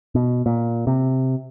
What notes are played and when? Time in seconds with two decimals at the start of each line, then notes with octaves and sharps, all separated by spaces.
0.15 B2
0.46 A#2
0.87 C3